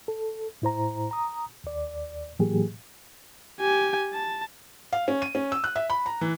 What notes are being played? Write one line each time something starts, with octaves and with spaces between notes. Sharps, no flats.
A4
A2 E4 C5 A#5
A#5 D#6
D#2 D5
A2 E3 F#3 A#3 G4 G#4
G4 G#5
A5
F5
C#4
D#7
C#4
E6
F#6
E5
B5
A#5
E3